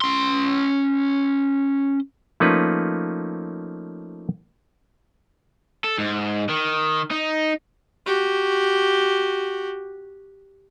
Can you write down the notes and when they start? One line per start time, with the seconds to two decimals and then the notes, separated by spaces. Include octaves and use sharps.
0.01 C#4 C6
2.40 F3 A3 A#3 C#4 D#4 B4
5.84 A4
5.98 G#2
6.49 D#3
7.11 D#4
8.06 F#4 G4